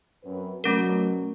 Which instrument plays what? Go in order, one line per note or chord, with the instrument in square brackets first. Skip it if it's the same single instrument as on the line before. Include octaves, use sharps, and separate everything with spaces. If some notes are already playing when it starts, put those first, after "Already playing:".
[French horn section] F#2 C4 B4
[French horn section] B2 F#3 [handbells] A3 C#4 A#4